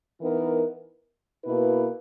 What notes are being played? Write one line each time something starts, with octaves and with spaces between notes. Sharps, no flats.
E3 B3 D#4 A#4
B2 A#3 E4 B4